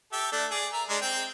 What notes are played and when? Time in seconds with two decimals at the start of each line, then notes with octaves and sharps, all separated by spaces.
0.12 G4 A4 E5
0.32 A3 D4 A4
0.51 G#4 D5
0.72 A#4 E5
0.90 G#3 D4
1.02 C4 G5